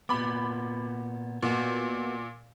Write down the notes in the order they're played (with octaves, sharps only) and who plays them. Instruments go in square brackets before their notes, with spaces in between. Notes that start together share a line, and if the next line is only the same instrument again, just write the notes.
[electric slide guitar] A#2 B3 [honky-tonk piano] B5 D6
[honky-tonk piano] A#2 [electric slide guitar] B3 F#4